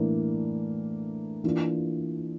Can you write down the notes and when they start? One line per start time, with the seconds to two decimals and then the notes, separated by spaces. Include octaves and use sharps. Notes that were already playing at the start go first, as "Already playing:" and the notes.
Already playing: A2 E3 A#3 D4
1.44 E3 A#3 D4 F4